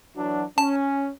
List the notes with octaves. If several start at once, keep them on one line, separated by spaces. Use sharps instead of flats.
E3 F#3 D4
C#4 A5